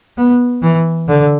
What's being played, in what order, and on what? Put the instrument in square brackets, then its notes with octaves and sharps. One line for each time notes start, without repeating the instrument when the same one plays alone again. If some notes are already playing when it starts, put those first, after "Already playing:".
[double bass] B3
E3
D3